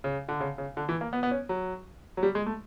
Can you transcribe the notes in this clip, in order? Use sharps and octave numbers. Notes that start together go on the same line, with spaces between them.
C#3
D3
C#3
C#3
D3
E3
A#3
B3
B3
C#4
F#3
F#3
G3
G#3
A3